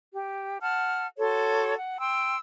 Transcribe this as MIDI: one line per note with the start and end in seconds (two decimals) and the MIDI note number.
0.15 0.57 67
0.61 1.06 78
0.61 1.06 81
0.61 1.06 89
1.18 1.74 66
1.18 1.74 69
1.18 1.74 73
1.18 1.74 84
1.77 1.96 78
1.99 2.38 79
1.99 2.38 84
1.99 2.38 88